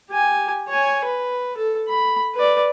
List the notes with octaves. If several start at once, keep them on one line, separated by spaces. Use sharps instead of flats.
G4 G#5
C#5 G#5
B4
A4
B5
B4 D5